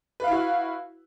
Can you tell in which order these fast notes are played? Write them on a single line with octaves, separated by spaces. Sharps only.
B4 F5 E4 F#4